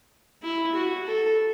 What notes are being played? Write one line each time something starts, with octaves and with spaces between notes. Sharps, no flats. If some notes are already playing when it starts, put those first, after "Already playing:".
E4
F#4
A4